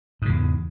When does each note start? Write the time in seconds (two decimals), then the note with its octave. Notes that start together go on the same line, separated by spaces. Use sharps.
0.22 G#2
0.25 C#3
0.29 E2